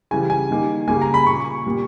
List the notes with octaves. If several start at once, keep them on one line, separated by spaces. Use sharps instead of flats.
C#3 E3 G3 G#5
G#5
D#3 G3 A#3
C#3 G3 A#3 G#5
A#5
B5
A#2 A#3 C#6
A#2 G3 A#3